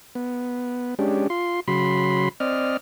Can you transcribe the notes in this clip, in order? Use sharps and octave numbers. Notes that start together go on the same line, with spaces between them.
B3
G#3 C#4 D4 G4
F4 C6
C#3 F#3 B5 C6
C4 D5 D#5 F6